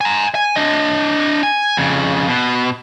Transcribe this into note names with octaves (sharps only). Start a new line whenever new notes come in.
G#5 A#5
G#5
D4 D#5
G#5
F2 C#3
B2